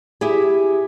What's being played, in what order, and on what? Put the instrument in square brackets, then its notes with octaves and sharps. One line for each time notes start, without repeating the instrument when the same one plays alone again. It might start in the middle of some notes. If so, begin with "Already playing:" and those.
[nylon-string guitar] E4 G4 G#4